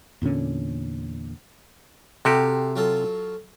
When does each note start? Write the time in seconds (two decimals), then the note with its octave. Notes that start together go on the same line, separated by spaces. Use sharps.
0.22 E2 A#2 D3 C#4
2.25 C3 F#4 G4 A4 F5
2.76 F#3 F4 A4